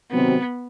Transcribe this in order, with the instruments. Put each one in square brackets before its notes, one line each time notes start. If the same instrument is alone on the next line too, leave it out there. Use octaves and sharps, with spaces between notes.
[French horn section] C3 D#3 F#3 C4 F#4 [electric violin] B3